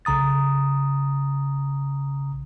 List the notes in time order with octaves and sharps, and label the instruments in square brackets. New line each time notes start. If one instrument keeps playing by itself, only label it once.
[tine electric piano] B1 C#3 A#5 D#6 A6